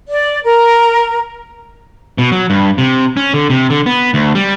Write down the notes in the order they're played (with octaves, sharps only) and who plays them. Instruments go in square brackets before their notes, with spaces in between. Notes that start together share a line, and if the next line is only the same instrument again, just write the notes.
[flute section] D5
A#4
[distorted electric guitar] B2
F#3
G2
C3
C#4
D3
C3
D3
B3
D2
G3